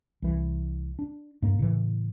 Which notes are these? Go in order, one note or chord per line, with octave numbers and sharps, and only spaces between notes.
C2 E3
D4
G2 A#3
A2 C#3 E3